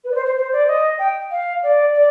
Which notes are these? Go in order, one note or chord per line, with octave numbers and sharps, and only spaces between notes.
B4
D5
C5
C5
C5
D5
D#5
G5
F5
D5
D5